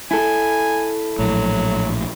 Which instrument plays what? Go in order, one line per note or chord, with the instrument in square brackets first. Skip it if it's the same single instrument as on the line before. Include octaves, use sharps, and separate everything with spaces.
[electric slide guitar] E4 A4 [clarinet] G#5
[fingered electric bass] A#1 A2 [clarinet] F#3